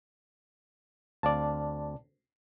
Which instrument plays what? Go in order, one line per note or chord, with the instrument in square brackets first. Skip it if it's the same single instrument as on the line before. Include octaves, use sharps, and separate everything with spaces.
[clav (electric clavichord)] D2 C4 F5 [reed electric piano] D5 A5